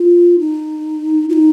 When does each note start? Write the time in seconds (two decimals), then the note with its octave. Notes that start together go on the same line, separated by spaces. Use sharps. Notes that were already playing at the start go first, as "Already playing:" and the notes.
Already playing: F4
0.39 D#4
1.29 F4
1.33 D#4